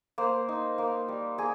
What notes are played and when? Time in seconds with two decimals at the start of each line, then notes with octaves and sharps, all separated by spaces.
0.18 A#3 C5
0.49 D#4
0.78 A#3
1.08 G3
1.38 A#3 G#4